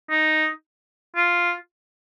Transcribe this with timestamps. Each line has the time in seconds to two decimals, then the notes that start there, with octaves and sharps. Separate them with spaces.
0.10 D#4
1.16 F4